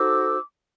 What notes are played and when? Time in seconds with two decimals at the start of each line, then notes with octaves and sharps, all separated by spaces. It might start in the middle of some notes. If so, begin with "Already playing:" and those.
Already playing: D#4 F#4 A4 C5 D6 E6